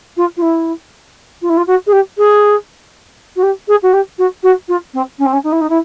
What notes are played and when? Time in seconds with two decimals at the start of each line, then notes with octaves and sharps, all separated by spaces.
0.17 F4
0.37 F4
0.42 E4
1.42 F4
1.49 E4
1.57 F4
1.67 F#4
1.87 G#4
1.92 G4
2.18 G#4
3.36 F#4
3.43 G4
3.68 G#4
3.83 F#4
3.93 G4
4.18 F#4
4.43 F#4
4.68 F4
4.94 C4
5.18 C#4
5.25 C4
5.33 C#4
5.43 D#4
5.52 E4
5.61 D#4
5.69 E4